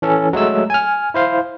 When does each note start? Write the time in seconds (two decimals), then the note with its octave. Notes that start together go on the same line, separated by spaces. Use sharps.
0.02 E3 C#4 A4
0.33 F#3 G#3 A3 E6
0.70 G#5 F6
1.14 E4 C5 F5